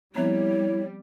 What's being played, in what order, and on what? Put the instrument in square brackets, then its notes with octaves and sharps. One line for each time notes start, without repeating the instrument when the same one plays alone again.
[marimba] F3 B3 C4 [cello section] G3 [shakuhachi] E4 [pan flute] C#5